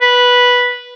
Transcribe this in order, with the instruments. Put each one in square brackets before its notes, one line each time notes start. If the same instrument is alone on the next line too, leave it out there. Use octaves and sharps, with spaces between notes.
[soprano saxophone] B4